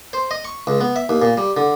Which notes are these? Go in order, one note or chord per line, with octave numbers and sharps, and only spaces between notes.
C5
D#5
C#6
C#2
B3
E5
D#2
A#2
G3
D3